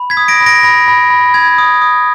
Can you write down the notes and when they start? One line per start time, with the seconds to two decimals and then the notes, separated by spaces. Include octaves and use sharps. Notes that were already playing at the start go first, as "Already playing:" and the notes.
Already playing: B5
0.10 G#6 B6
0.17 D#6
0.28 A#6 D7
0.41 B5
0.46 A#6 D7
0.63 B5 A#6
0.88 B5
1.10 B5
1.34 B5 G#6
1.58 D#6
1.82 D#6